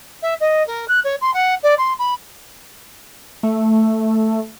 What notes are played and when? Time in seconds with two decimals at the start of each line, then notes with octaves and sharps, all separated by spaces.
0.22 E5
0.40 D#5
0.67 A#4
0.88 F#6
1.04 C#5
1.21 C6
1.34 F#5
1.63 D5
1.78 C6
1.99 B5
3.43 A3